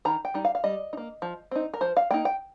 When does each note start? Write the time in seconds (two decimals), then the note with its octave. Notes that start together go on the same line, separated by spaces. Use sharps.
0.05 D#3 A#5
0.25 G5
0.34 G3 D#4
0.45 F5
0.55 F5
0.64 G3 D#5
0.93 D#4
0.97 A#3
1.22 F3
1.51 C4 D#4
1.74 A#4
1.81 F3 C5
1.97 F5
2.11 A#3 D#4 G5
2.25 G5